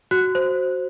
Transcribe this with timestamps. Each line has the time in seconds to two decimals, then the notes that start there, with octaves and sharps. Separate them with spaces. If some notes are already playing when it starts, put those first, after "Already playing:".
0.11 F#4 F#6
0.35 C5